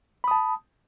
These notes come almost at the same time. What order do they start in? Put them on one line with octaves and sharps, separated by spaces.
B5 D#6 A5